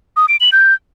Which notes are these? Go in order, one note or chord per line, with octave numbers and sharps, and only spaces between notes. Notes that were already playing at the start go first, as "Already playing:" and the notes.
D#6
D7
F#7
G6